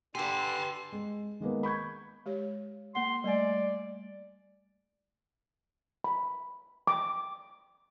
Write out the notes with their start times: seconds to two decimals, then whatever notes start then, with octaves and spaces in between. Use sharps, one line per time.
0.15 D3 G4 B4 G#5 A5 C6
0.92 G#3
1.40 D#3 G#3 A#3 B3
1.63 B5 C#6 G6 G#6
2.26 G#3 G4 C#5
2.95 A#3 F#5 C6
3.24 G3 A3 D5 G#5
6.04 B5
6.87 D6